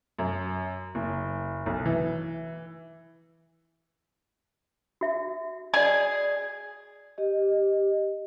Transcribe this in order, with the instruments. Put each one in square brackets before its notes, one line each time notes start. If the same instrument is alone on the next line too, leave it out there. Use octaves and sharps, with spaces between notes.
[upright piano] F#2
F#1
B1
E3
[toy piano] F#4 E5
[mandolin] G#4 [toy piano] D5 D#5
[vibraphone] G4 D#5